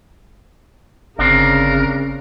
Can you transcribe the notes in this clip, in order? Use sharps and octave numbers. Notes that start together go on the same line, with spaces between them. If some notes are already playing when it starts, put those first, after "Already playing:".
G1 C#3 C4 D4 A#4